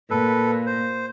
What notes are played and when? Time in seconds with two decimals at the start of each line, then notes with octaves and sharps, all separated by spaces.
0.11 A#2 A4 B4
0.66 C5